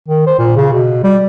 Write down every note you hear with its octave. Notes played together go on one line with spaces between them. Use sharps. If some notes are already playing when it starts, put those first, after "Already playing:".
D#3
C5
A#2
C#3
B2
G3